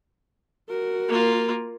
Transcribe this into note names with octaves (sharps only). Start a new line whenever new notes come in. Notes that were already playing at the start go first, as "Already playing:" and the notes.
F#4 A#4
A#3 F4